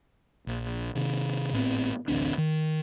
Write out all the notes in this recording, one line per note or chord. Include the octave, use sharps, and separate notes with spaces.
A#1
C3 D#3
G#1 A2 B3 C4
A1 D2 C4 D4
D#3